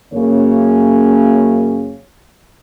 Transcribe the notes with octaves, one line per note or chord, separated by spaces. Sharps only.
F#2 C#3 A#3 C#5